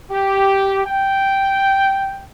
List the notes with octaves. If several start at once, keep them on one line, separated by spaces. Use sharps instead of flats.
G4
G5